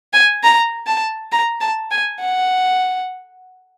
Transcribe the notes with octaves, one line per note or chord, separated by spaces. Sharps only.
G#5
A#5
A5
A#5
A5
G#5
F#5